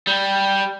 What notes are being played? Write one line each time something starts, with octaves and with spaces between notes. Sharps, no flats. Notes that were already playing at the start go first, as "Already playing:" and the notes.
G3